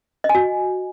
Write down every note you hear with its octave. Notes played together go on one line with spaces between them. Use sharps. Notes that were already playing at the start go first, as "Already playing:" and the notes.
D#5
G#5
F#4